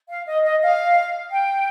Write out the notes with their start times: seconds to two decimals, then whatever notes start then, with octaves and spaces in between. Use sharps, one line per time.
0.09 F5
0.26 D#5
0.44 D#5
0.62 F5
1.30 G5